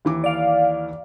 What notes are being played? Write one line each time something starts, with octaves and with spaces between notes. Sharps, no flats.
D#2 E3 D6
D5 F5